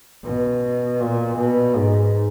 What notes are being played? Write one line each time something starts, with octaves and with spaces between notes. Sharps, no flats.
B2
A#2
B2
G#2